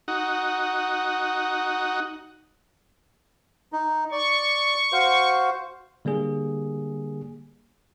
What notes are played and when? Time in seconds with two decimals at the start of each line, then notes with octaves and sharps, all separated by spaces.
0.08 D#4 F#4
3.73 D#4
4.12 D5 C#6
4.92 F#4 C5 F5
6.05 D3 G3 A#3 G#4